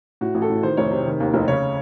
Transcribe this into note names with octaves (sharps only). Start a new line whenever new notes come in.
A2 F#4
A1
A4
A2
D#3 C5
F1 C#5
C3
D#3
D#2
F1
C#3 C#5